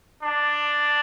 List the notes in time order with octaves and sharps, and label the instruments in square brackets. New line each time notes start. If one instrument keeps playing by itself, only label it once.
[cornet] D4